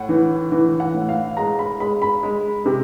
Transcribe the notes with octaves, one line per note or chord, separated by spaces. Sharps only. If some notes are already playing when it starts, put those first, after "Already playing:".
Already playing: A2 F#5
E3
E3
F#5
A2
F5
G#3 A#5
B5
G#3 B5
B5
G#3
C3